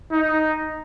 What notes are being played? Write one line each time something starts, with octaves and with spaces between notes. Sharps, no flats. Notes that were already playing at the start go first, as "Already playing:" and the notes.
D#4